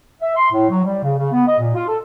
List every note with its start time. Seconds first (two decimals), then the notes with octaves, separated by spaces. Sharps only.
0.21 E5
0.36 C6
0.52 A2
0.70 F#3
0.85 G3
1.03 C#3
1.17 C#3
1.32 B3
1.48 D#5
1.59 A#2
1.75 F4
1.88 A4